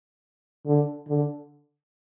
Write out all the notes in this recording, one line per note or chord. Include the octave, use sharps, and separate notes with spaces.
D3
D3